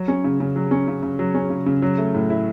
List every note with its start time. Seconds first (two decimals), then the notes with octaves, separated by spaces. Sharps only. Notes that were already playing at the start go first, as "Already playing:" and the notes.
Already playing: F#3
0.08 C#4
0.24 C#3
0.40 C#3
0.56 F#3
0.71 C#4
0.88 C#3
1.03 C#3
1.19 F#3
1.34 C#4
1.50 C#3
1.66 C#3
1.82 F#3
1.98 A3
2.14 A2
2.30 E4